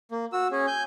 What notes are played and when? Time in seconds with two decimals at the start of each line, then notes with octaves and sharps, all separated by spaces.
0.12 A#3
0.33 F#4 E6
0.52 C#4 G#4
0.67 G#5 G6